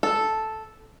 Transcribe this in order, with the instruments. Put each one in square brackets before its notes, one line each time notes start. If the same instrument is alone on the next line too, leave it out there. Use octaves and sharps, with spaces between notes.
[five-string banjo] A4